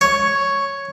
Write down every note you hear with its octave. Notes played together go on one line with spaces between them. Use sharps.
C#5